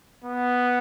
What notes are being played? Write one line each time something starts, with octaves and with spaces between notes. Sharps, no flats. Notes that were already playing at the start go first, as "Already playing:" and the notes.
B3